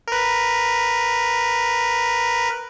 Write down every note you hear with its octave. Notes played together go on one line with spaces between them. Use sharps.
A#4 B4